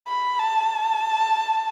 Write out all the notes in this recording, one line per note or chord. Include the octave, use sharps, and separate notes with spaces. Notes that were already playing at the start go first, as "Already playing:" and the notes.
B5
A5